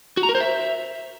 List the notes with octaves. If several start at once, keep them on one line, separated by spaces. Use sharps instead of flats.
F#4
A#5
A#4
C5
E5